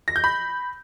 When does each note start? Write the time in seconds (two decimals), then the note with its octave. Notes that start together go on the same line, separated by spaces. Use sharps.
0.08 A#6
0.16 G6
0.24 B5